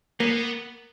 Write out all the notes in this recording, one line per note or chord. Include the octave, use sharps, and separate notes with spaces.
A#3 B3